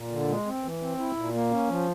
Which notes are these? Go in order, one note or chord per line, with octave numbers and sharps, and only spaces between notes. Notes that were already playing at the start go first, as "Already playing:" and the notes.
Already playing: A#2
D3
G#3
C4
E3
C4
E4
A#2
A#3
C#4
F3